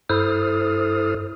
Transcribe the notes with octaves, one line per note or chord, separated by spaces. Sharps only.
G2 E4 A4 C5 D#6 F6